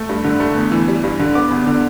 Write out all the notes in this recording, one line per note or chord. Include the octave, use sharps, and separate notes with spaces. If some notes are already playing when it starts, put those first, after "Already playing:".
Already playing: A3
G2
D3
A3
E2
E3
G3
G2
D3
B3 D6
E2
D3